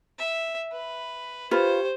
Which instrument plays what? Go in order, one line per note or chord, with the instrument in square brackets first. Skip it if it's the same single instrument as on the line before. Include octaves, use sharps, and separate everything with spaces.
[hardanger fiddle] E5
B4
[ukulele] F4 B4 [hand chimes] G4 [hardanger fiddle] C5